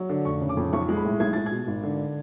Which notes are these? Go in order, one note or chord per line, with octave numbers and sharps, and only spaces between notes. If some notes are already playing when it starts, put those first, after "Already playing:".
Already playing: F#3
D3
F1 C#6
C#3
D6
F2
B1 C#6
G#3
B5
A2
B1 G#6
G#3 A6
G#6
B2
G#1
D3